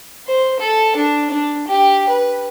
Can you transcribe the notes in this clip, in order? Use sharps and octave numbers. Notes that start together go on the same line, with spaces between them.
C5
A4
D4
D4
G4
B4